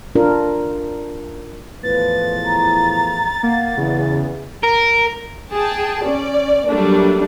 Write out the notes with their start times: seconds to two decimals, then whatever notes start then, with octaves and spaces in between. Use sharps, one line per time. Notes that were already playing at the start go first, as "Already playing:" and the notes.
0.15 D4 F4 A#4
1.83 E2 A2 F3 B4 A6
2.45 A#5
3.43 A#3 F#5
3.77 E2 C#3
4.64 A#4
5.55 G#4 G5 A5
6.05 C#4 D5
6.69 F#3 G3 A3 A#3 D4